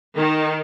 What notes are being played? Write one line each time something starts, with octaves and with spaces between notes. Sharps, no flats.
D#3